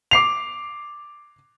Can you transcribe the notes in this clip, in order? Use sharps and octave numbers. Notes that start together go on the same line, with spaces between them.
D6 C7 F7